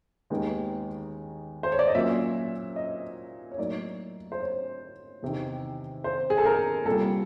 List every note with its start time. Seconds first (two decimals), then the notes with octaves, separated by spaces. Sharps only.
0.30 D#2 D#3 G#3 B3 D#4
1.63 C5
1.72 C#5
1.79 D5
1.87 D#5
1.95 A#2 F#3 A#3 C#4 E5
2.76 D#5
3.52 C#5
3.58 A2 F#3 A#3 D#4 D5
4.32 C5
4.41 C#5
5.23 E2 C3 D#3
6.04 C5
6.30 G#4
6.38 A4
6.45 A#4
6.85 C2 A#2 G3 A4